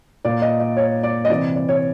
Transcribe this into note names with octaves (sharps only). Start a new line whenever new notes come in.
A#2 D5
D#5
D#5
C#5
D5
D#5
C3 E3 D5
D5
C#5